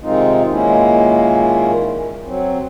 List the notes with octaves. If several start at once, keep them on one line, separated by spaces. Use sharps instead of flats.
C3 D#3 G#3 C4 D#4 F4
A#2 D#3 G#3 A#3 C#4 E4
F#3 C4